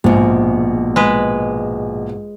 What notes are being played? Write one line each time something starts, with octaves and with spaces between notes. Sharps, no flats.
A#1 G#2 B2
G#3 B4